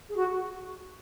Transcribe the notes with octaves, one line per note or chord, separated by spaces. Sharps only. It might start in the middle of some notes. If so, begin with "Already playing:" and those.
G#4
F#4